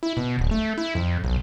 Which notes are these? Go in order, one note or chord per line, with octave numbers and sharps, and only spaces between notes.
E4
B2
D1
A3
E4
F2
B1